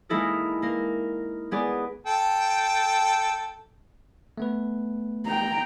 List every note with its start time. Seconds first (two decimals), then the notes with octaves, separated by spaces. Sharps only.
0.09 G#3 A#3 D#4 E4 A4 A#4
0.62 A#3 A#4
1.51 G#3 B3 G#4 D5
2.07 A4 G5
4.38 A3 B3 B4
5.26 G5 A#5